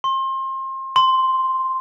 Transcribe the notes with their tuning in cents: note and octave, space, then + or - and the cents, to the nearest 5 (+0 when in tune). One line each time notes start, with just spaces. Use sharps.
C6 +30
C6 +0